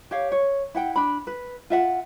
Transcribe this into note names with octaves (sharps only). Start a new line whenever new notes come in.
G4 C#5 F5
C#5
E4 F#5 G5
D4 B5
B4
F4 E5 F#5